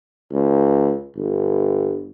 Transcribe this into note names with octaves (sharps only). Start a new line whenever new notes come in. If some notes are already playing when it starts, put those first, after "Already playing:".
C#2
G1